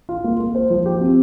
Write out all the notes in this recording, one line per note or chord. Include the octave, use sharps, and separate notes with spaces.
F4
A#3
A#3
C5
F3
G4
C4